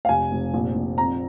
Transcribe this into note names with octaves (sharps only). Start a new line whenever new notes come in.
F5
F1 G#5
F1
A#1
A#1
F2 A#5